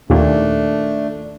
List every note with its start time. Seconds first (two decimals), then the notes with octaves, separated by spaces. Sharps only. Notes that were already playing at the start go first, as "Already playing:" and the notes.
0.10 D#2 A#2 A3 D4